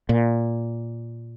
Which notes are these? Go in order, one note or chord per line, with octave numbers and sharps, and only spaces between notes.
A#2